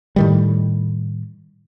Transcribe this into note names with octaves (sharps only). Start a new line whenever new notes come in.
A2 D#3 G3